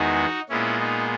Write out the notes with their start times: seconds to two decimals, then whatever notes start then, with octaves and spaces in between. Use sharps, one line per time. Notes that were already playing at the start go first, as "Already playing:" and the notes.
Already playing: E2 D#3 G#3 B3 D#4 F#4
0.49 A#2 G#3 B3 C#4 E4
0.79 D#4